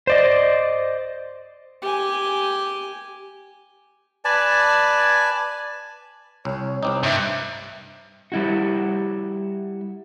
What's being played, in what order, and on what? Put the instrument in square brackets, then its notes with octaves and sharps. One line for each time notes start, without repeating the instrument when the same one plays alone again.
[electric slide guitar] C5 D5 D#5
[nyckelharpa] G4 G#5
[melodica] B4 D5 G#5 A5
[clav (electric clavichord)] C2 [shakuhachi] C#5
[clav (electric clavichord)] C2 C4 D#4 [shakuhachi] D6
[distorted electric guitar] G2 [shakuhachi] E5
[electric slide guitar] G3 E4 F#4